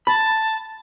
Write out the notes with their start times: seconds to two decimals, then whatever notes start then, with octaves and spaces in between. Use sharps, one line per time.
0.07 A5 B5